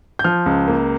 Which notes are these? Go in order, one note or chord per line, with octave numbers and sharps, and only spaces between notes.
G6
F3 F6
C#2
A#3